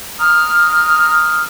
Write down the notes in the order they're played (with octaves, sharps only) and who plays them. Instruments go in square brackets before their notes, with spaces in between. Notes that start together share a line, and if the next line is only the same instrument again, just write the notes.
[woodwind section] A#5 D#6 F6